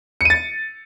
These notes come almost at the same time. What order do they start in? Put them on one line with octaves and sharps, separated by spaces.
C#7 D#7 A6